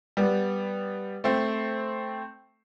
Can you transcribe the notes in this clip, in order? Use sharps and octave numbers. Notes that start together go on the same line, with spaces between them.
G3 B3
A3 C4